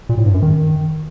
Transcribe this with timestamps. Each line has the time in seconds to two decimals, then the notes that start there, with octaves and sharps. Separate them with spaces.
0.09 A#2
0.18 A2
0.26 G2
0.34 F#2
0.42 D#3